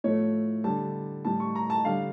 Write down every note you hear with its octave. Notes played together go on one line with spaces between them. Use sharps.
A2 F3 A3 C#5
D3 G3 A5
A2 G3 A5
C#6
A#5
A5
D3 G3 F5